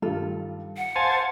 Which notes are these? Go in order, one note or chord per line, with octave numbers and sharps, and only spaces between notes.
G2 D#3 F4 A4
F#5
C5 F5 G#5 A5 D#7 F7